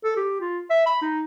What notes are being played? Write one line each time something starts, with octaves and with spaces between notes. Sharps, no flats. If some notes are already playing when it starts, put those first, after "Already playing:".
A4
G4
F4
E5
B5
D#4